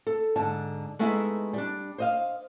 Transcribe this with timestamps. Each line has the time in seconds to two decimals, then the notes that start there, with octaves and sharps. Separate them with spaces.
0.07 A4
0.36 G#2 D3 A5
0.99 G#3 A3 B3 D#4 E4 E5
1.53 G3 D4
1.98 C5 D#5 F5